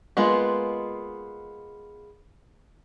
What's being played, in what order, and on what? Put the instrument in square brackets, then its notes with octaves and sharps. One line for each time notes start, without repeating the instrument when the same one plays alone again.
[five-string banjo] G#3 A#3 B3 F4